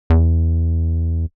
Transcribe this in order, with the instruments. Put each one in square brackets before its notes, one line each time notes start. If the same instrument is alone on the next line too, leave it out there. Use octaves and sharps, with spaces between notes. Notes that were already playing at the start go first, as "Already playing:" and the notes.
[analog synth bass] E2